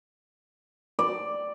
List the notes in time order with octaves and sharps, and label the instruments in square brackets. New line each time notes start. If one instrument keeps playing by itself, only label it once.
[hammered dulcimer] D5